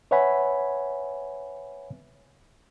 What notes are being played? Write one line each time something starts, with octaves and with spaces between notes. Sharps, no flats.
B4 C#5 E5 F#5 G#5 B5